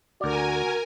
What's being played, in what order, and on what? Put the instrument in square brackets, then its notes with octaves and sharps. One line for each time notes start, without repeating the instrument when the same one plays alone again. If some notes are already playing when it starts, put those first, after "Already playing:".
[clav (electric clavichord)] D2 D5 [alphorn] F#4 [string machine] A#4 G#5